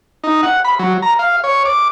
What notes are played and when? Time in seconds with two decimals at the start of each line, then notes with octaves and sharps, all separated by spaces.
0.24 D#4
0.43 F#5
0.65 B5
0.79 F#3
1.02 A#5
1.19 F5
1.44 C#5
1.65 D6